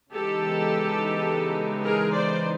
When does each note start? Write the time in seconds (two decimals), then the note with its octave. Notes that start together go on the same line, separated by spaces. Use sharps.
0.12 C#3 E3 G#3 B3 D#4 G4 A4
1.84 G#4 A#4
2.13 C5 D5